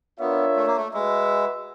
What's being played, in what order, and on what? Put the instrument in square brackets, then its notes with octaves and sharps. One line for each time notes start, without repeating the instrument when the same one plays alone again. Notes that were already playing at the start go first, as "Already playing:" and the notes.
[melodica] B3 [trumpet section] D4 F4 A#4 C#5 E5
[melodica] A3
A#3
A3
[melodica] G#3 [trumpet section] F#4 B4 E5